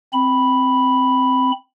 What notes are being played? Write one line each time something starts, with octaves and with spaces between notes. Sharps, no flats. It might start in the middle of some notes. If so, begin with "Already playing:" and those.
C4 B5